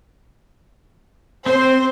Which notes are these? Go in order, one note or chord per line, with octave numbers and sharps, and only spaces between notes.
C4 C5